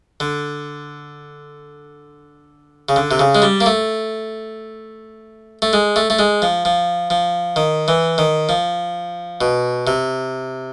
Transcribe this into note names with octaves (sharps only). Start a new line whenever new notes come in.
D3
C#3
D3
C3
C#3
G#3
G3
A#3
A3
A3
G#3
A3
A3
G#3
F3
F3
F3
D#3
E3
D#3
F3
B2
C3